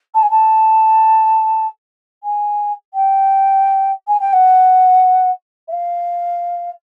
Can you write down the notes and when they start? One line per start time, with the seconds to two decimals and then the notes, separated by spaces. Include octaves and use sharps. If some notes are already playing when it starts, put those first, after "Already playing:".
0.15 A5
0.23 G#5
0.31 A5
2.24 G#5
2.94 G5
4.08 G#5
4.20 G5
4.33 F#5
5.68 E5
5.72 F5